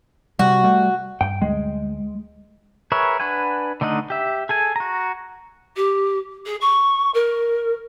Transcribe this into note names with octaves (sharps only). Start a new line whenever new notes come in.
C3 G3 F#4
G3 A3
G2 G5
D2 G3 G#3
G#4 A#4 B4 C#5 E5
D4 B4 F#5 G#5
D3 A3 D#4 D#5 F#5
G4 E5
G#4 A4 G#5
F#4 A#5
G4
G#4
C#6
A#4